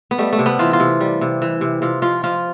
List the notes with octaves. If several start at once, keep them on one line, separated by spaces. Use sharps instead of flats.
B3
G3 A3
A3
C3
B3
E3 F4
F4
C3
G3
C3
E3
C3
C3 F4
F3 F4
F3 F4